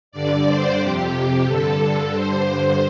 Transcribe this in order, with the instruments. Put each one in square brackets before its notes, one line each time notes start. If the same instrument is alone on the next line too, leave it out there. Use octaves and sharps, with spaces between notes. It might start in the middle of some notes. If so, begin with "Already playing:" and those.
[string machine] G2 D3 D5
C5
F2 C3 G4
G4
G2 D3 A4
G2 D3 C5
C5